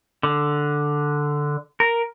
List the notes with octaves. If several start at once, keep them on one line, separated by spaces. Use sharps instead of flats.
D3
A#4